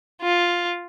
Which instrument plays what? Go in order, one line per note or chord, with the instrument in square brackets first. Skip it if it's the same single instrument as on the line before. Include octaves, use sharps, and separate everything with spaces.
[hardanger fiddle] F4